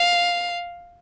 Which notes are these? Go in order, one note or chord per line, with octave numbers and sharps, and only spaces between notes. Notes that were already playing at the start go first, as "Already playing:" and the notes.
Already playing: F5